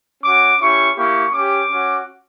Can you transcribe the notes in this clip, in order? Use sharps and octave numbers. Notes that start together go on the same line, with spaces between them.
C#4 F#4 D6
C#4 E4 G4 C#6
A#3 E4 G4 C#6
C#4 G4 D6
C#4 F#4